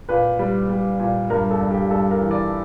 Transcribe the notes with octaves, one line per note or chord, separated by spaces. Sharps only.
A#2 B4
G3
G3
A#2
G2 A#4
A4
G2
G4
G2 A4
A#4
E3
D5